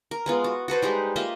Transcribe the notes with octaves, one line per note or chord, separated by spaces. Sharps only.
A#4
G#3 B3 F4
F#4
F#4 A4 B4 C5
G3 G#3 D#4 G4
A#3 F4 D#5 E5